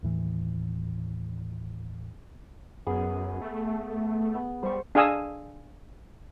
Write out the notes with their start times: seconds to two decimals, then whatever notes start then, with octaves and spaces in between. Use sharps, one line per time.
0.03 D#2 A2 E3
2.86 F#2 B3 G#4
3.41 A3
4.35 B3
4.63 G3 C5 C#6
4.95 D4 G#4 F5 G#5 D#6 E6